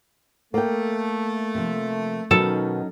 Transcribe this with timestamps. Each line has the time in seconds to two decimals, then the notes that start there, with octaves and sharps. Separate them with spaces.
0.54 A3 A#3 G5
1.55 C3 F3
2.31 B2 D#3 F#3 C#4 D#4 A4